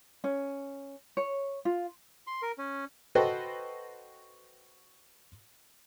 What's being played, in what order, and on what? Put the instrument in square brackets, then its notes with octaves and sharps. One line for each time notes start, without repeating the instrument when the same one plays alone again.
[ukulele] C#4
C#5
F4
[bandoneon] C6
A#4
C#4
[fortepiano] F#4 A4 B4 C5 D#5 G5